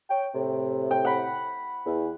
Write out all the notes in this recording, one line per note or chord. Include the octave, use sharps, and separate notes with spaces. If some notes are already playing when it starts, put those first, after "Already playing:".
C#5 G5
A2 C3
G5
F#5 B5
E2